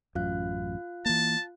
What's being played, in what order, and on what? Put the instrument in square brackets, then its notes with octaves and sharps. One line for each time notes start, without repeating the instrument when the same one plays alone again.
[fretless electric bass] A1 F#2 [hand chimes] F4 F5 F#6
[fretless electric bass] E3 A#3 [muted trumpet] A5